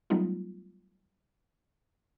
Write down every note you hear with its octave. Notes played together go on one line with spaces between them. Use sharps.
F#3 G3 A3 B3 D#4 F4